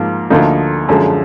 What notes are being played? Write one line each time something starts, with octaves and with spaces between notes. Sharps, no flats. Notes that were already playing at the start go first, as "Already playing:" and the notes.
Already playing: G#2 F3 A#3
D2 D3 F3 A#3 D#4
F#2 D3 F3 G#3